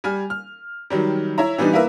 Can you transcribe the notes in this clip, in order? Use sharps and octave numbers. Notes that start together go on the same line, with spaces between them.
G3 G#5 F6
F6
D#3 F#3 G3
E4 C#5 E5 A#5
E3 G3 B3 D4 D#4
A#3 E4 A#4 B4 E5